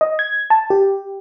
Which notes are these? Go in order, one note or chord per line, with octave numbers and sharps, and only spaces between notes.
D#5
G#6
A5
G4